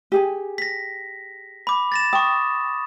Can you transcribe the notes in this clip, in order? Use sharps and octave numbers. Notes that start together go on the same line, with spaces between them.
G4 G#4 G#5
A#6 B6
B5 D6
A6 A#6 E7
G5 C#6 D#6